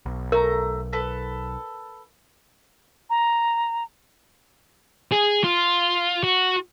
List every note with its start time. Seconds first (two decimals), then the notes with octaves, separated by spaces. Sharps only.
0.06 B1
0.32 A3 A#4 A#5
0.93 A4 B4
3.10 A#5
5.12 G#4
5.44 F4
6.24 F#4